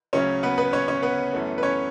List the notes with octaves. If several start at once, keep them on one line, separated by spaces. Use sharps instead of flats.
D2 C#3 F#3 C#4 C#5
B3 B4
B3 B4
C#4 C#5
C#4 C#5
B3 B4
F#2 E3 A3 C#4
B4
C#4 C#5